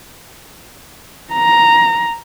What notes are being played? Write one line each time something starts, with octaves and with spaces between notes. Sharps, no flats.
A#5